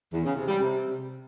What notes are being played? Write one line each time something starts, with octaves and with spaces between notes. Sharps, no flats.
E2
C#3
C3
G3
C3